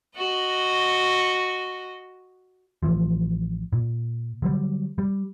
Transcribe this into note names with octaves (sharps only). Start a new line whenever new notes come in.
F#4 D#5
A1 E3 F3
A#2
D3 F#3 G3
G3